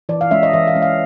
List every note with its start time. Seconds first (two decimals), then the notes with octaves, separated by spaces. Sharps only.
0.09 E3 D5
0.21 F5
0.31 G#3 C#4 E5
0.43 D#5
0.53 E3 E5
0.67 F5
0.76 G#3 C#4
0.82 F5